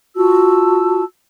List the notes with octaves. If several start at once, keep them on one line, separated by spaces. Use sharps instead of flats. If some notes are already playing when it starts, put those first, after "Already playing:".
F4 F#4 A5 E6